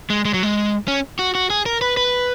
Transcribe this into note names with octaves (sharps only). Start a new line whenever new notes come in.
G#3
G#3
F#3
G#3
C#4
F#4
F#4
G#4
A#4
B4
B4